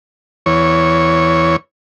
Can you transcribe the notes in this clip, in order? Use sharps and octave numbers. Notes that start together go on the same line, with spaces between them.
E2 C#5